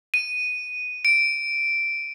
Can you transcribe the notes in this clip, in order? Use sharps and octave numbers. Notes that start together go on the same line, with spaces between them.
D#7
D7